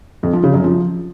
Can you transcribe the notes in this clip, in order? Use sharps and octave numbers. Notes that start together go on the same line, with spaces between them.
F2
F3
C#3
F#2
F3